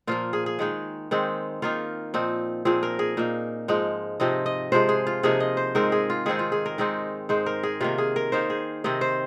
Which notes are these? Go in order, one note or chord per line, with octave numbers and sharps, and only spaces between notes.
A#2 F3 A#3 F4
G#4
G#4
D#3 G#3 D#4
D#3 G#3 C4 D#4
D#3 A#3 D#4 F4
A#2 F3 C4 D#4
A#2 F3 C4 G#4
A#4
G#4
A#2 A#3 D#4
G#2 F3 G#3 D#4
C3 F3 C4 D#4 D#5
D#5
C3 F3 G#3 C5
G#4
F4
C3 F3 A#3 D#4 G#4
D#5
C5
G#2 G#3 C4 D#4 A#4
G#4
F4
D#3 G#3 C4 D#4 G#4
F4
G#4
A#4
D#3 G#3 C4 D#4
G#2 G#3 D#4 C5
A#4
G#4
C3 D#3 A#3 F4
G#4
A#4
D#3 A#3 D#4 C5
G#4
C3 D#3 C4 D#5
C5